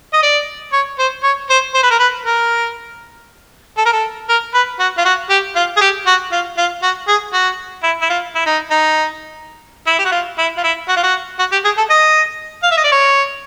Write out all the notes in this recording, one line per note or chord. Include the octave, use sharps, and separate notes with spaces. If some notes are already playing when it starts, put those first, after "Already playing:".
D#5
D5
C#5
C5
C#5
C5
C5
B4
A#4
B4
A#4
A4
A#4
A4
A#4
B4
F#4
F4
F#4
G4
F4
G#4
G4
F#4
F4
F4
F#4
G#4
F#4
E4
E4
F4
E4
D#4
D#4
E4
G4
F#4
F4
E4
F4
E4
F#4
F4
F#4
F#4
G4
G#4
A4
D#5
F5
E5
D#5
D5
C#5